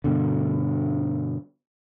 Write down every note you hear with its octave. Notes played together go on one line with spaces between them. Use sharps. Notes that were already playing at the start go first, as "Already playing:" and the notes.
G2 B2 D3